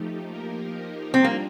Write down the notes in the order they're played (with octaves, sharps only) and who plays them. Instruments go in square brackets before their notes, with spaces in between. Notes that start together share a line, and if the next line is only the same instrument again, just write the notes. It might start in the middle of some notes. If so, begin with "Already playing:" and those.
Already playing: [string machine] F3 A3 D#4 G4
F3 A#3 D#4 G4 A#4
[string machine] G3 D4 F4 [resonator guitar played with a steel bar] C4
[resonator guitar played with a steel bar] A#3